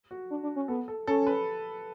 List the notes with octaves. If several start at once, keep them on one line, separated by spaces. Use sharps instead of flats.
F#4
D4
D4
C#4
B3 A4
A4
C#4 A4
B4